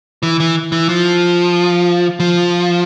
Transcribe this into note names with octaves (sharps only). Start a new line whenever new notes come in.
E3
E3
E3
F3
F3